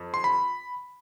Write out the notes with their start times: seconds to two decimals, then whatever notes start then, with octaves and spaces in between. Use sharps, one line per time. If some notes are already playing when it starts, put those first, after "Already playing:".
Already playing: F2
0.14 C6
0.24 B5